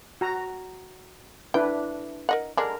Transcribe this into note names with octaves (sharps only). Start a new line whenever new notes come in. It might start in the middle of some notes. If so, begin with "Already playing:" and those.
F#4 A#5
D4 E4 B4 G5
A#4 D#5 F#5
D3 G#3 D4 A#4